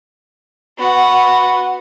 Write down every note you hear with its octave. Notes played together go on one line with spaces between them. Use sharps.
B3 F#4